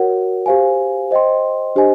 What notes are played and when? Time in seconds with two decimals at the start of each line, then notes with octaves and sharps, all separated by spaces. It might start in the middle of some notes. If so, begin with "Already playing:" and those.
Already playing: F#4 A#4 C#5 F#5
0.46 G4 C5 F5 G#5
1.11 C5 D#5 G5 C6
1.76 D4 G4 C5 D#5 G#5